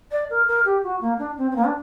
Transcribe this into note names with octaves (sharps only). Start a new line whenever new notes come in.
D5
A#4
A#4
G4
F#4
A#3
D4
C4
C4
A#3
D4